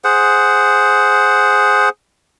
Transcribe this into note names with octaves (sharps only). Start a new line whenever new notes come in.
G#4 C5 F#5